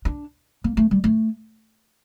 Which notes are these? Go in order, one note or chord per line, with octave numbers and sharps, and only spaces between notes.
D4
A#3
A3
G3
A3